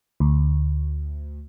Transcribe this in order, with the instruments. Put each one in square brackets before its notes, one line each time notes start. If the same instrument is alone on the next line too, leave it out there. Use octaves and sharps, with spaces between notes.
[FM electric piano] D2